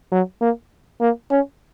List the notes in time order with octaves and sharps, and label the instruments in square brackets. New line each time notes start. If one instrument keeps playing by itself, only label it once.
[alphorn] F#3
A#3
A#3
C#4